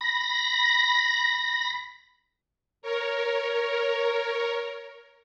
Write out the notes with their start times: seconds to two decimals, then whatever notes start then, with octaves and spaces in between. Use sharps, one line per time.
0.01 B5 A#6
2.82 A#4 C#5